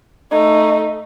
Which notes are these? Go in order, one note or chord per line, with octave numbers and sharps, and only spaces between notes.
A3 D#4